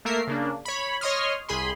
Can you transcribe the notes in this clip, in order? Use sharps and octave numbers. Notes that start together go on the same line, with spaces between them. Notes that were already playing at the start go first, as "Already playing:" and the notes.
A3 A#3 A#4 E5 C7
C#3 A#3 D4
C#5 B5
C#5 D#5 C6 D#6 F6
C2 G#4 B5 C6